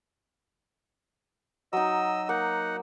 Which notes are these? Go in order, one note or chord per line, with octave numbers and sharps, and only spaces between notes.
F#3 D#4 D#5 E6
A#3 D#4 F#5